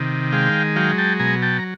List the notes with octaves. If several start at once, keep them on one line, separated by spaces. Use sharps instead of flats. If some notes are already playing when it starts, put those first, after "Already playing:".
Already playing: C3 D#3
G#3 F5 G5
F#3 F5 G5
G5 A5
B2 G#5 A#5
G5 A5
A#5